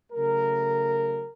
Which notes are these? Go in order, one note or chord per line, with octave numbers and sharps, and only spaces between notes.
C#3 F#3 A3 A#4